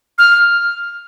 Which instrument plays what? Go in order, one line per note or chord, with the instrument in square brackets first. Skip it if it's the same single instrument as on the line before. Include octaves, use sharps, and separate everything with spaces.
[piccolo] F6